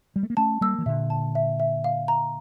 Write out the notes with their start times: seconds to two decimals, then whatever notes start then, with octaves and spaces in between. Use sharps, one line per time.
0.16 G3
0.23 A3
0.30 A#3
0.37 A3 C#4 A5
0.61 G3 A#3 E6
0.78 E3
0.86 A#2 D3 E5
1.10 A5
1.35 E5
1.60 E5
1.84 F5
2.08 A#5